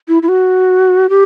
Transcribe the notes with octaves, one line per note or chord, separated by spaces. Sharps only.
E4
E4
F#4
G4